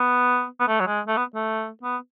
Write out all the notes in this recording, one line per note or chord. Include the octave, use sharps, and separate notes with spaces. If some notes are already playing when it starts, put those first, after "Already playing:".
Already playing: B3
B3
A3
F#3
G#3
A3
B3
A3
B3